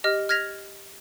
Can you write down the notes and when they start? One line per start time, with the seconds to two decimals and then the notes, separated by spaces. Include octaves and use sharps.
0.04 G4 D#5 F6
0.29 F6 G#6 A#6 B6 F7